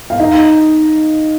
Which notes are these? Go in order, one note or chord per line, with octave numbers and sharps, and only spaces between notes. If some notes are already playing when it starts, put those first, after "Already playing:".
F5
D#4 D#5